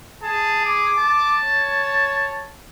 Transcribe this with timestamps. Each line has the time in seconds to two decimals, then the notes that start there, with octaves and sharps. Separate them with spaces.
0.23 G#4 A5
0.66 D6
0.98 A5
1.44 C#5